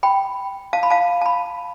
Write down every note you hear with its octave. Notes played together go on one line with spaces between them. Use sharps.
G5 B5
F5 A5
B5
F5 A5
A5
B5